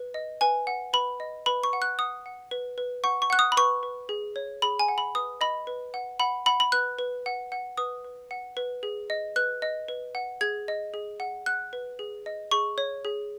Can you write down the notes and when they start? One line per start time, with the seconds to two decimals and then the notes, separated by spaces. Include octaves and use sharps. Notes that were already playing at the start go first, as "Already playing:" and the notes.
Already playing: B4
0.14 D#5
0.41 B4 G#5
0.67 F#5
0.93 B4 B5
1.20 D#5
1.46 B4 B5
1.64 C#6
1.73 F#5
1.82 F#6
1.99 F#5 D#6
2.26 F#5
2.51 B4
2.78 B4
3.04 F#5 C#6
3.22 C#6
3.30 F#5 F#6
3.39 D#6
3.52 B5
3.57 B4 C#6
3.83 B4
4.09 G#4
4.36 C#5
4.62 G#4 B5
4.79 G#5
4.88 F#5
4.98 B5
5.15 B4 D#6
5.41 D#5 B5
5.67 B4
5.94 F#5
6.20 F#5 B5
6.46 F#5 B5
6.60 B5
6.72 B4 F#6
6.99 B4
7.26 F#5
7.52 F#5
7.77 B4 D#6
8.05 B4
8.31 F#5
8.57 B4
8.83 G#4
9.10 D#5
9.36 B4 F#6
9.62 D#5
9.88 B4
10.15 F#5
10.41 G#4 G#6
10.68 D#5
10.94 G#4
11.20 F#5
11.46 F#5 F#6
11.73 B4
11.99 G#4
12.26 D#5
12.51 G#4 C#6
12.78 C#5
13.05 G#4